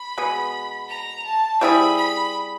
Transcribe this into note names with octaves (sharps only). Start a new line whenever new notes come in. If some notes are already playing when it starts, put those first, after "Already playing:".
Already playing: B5
B2 G#3 B3
A#5
A5
G3 C4 E4 G#4 B5
B5